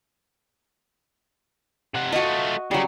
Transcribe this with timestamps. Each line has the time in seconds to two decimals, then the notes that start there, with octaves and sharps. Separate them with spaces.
1.95 C3 F#5
2.12 A3 F4 F#4 D#5
2.71 C#3 F#3 G3